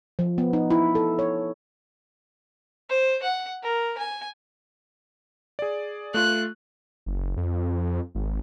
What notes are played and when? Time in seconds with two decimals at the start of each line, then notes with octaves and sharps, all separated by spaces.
0.19 F3
0.38 B3
0.53 D#4
0.70 E4
0.95 A4
1.19 C#5
2.89 C5
3.22 F#5
3.63 A#4
3.98 G#5
5.59 G#4 D5
6.14 A3 F4 F#6
7.06 F#1
7.37 F2
8.15 G#1